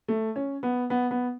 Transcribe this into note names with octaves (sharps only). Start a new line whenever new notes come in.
A3
C#4
B3
B3
B3